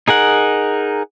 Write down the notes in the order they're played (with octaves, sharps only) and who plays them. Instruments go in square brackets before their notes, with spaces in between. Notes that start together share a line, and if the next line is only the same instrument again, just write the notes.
[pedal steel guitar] D#4 G#4 A#4 F#5